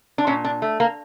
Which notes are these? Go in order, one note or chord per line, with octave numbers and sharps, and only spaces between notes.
D4
A#2 C#4
D4
A3
A#3